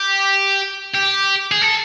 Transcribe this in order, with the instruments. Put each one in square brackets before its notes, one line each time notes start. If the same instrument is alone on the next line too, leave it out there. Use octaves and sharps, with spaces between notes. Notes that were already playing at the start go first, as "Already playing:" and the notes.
Already playing: [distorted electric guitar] G4
G4
G#4
A4